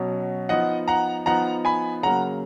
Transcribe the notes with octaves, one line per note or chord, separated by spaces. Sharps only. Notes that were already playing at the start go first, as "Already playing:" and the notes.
Already playing: B2 F#3 C#4
F3 B3 D#4 D#5 F#5
F#5 A#5
F3 B3 D#4 F#5 A#5
G#5 B5
C#3 F#3 A#3 F#5 A#5